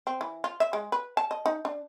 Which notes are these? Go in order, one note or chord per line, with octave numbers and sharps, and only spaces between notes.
C4
E3
F4
E5
G#3
B4
A5
D#5
D#4
D4